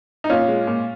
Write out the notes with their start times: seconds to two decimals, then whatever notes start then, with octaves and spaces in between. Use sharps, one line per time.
0.24 D#4
0.30 A#2 C#4 F4
0.48 G#3
0.67 A#2